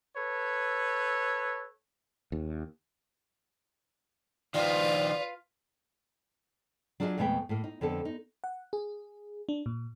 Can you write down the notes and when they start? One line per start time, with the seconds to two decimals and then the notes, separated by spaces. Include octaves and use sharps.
0.16 A4 B4 C#5
2.32 D#2
4.54 D#3 F3 F4 B4 D5
7.00 F#3 D4 F4 G#4 C5 D#5
7.18 F2 B2 G#3 A3 B4 G5
7.49 A2 A#3
7.64 D#4
7.81 F2 D3 B3 A4
8.05 D#4
8.44 F#5
8.73 G#4
9.49 D4
9.66 A#2